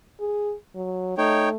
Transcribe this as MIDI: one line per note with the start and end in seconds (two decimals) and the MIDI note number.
0.20 0.54 68
0.75 1.15 54
1.18 1.57 57
1.18 1.49 63
1.18 1.49 73
1.18 1.49 79